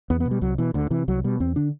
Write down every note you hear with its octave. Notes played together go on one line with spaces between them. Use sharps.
E2 B3
B3
B2
G3
C2 F#3
B2 E3
D2 D3
C3 E3
C2 F#3
B2 G3
E2 C4
D3 D4